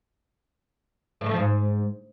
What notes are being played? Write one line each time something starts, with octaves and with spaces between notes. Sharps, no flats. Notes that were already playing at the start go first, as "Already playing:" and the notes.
A2
A3
F3
G#2